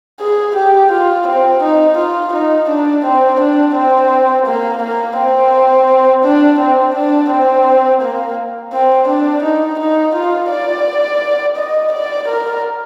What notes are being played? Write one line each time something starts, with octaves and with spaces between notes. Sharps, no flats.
G#4
G4
F4
C4
D#4
F4
D#4
D4
C4
D4
C4
A#3
A#3
C4
D4
C4
D4
C4
A#3
C4
D4
D#4
D#4
F4
D5
D#5
D5
A#4